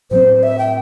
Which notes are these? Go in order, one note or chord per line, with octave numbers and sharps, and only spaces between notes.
A2 F#3 C4 C5
E5
G5